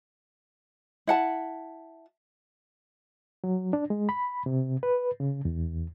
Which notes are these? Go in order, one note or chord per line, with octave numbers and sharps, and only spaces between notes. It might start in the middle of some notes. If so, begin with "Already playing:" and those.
E4 F#5 A5
F#3
D4
G#3
B5
C3
B4
C#3
E2